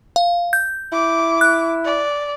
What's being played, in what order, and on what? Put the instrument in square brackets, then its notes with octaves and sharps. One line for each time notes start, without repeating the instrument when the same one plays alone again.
[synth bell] F5
G6
[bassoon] E4 [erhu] D6
[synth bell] F#6
[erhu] D5